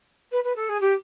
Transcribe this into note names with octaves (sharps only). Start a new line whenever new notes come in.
B4
B4
A4
G#4
G4